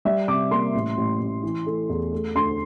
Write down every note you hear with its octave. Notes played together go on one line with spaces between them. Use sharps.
G3 E5
C3 D6
A#3 C6
A1
A1
A1
E3
A3
E2
A3
D2 C6